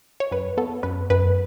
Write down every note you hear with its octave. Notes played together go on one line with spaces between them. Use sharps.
C#5
F#2 B4
B3 A4
F#2 B4
F#2 B4